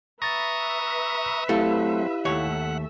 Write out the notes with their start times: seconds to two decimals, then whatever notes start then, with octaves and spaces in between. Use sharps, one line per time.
0.22 B4 E5 A#5 C#6 D#6 A6 A#6
1.49 F#3 A3 C4 E4 G4 F5
2.25 D#2 A3 C#5 E5 F#5